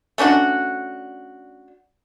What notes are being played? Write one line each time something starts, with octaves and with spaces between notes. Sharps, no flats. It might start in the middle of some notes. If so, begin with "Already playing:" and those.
A3 C#4 D4 F#4